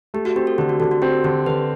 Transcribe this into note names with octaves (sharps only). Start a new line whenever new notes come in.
A3 G4
F#4
C4 G4
A4
D3 G4
F#4
D3 F#4
F#4
C4 G4
D3 G4
D3 B4